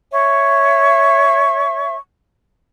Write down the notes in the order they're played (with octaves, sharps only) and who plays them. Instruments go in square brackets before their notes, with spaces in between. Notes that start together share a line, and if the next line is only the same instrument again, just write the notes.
[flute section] C#5 E5 C#6